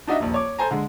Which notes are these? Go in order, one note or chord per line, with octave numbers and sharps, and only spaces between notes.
D4 D#4 F#4 D#5 E5
D#1 A#1
C#5 D6
A4 C5 G#5 A#5
D3 G#3